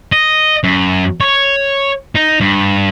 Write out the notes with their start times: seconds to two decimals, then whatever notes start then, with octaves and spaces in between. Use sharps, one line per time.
0.12 D#5
0.64 F#2
1.20 C#5
2.15 D#4
2.40 G2